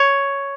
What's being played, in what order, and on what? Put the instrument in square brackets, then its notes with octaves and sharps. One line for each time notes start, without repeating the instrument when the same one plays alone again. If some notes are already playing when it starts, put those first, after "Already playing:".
Already playing: [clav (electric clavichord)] C#5